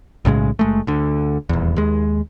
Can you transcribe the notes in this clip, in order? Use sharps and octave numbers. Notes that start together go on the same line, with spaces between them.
B1 A2 C#3 G#3
F#1 G#3 A3
D2 D3
D#1 E2
D#2 G#3